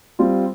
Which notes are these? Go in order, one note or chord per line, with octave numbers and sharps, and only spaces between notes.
G3 C4 F4